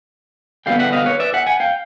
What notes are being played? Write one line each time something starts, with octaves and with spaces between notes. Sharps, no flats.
D3 G3 B3 F5 G5
E5 F#5
D#5 F5
B4 C#5
D5 E5
E5 F#5
F#5 G#5
F5 G5